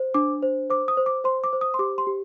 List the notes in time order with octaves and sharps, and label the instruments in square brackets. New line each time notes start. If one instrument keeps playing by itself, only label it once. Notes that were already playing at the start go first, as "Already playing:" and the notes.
Already playing: [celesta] C5
D4 D6
C5
C5 D6
D#6
C5
D6
C5 C6
D6
C5
D#6
C6
G4 D6
C6
G4